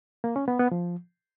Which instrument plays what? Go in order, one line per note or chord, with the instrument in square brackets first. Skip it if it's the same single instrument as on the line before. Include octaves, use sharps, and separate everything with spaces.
[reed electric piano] A#3
C#4
B3
B3
F3